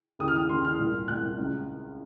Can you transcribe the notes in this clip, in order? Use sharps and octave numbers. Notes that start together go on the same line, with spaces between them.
D#2 C#3 D#6
F6
D#6
D#2 C#3 C6
F6
C2 A#2
C2 A#2 F#6
C#2 C#3